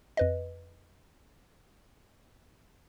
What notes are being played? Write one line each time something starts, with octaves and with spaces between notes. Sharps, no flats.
F2 B4 D#5